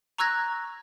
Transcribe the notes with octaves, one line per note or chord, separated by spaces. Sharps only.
A#5 C#6 E6 F#6 G#6 A#6